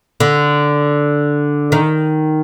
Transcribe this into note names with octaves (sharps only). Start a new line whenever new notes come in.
D3
D#3